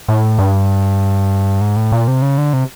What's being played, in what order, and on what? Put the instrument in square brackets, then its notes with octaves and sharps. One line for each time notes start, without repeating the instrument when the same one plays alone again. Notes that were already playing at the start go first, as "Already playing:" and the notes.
[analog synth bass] A2
G2
G#2
A2
A#2
C3
C#3
D3
C3